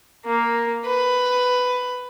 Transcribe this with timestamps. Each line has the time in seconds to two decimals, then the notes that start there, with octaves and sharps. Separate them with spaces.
0.25 A#3
0.86 B4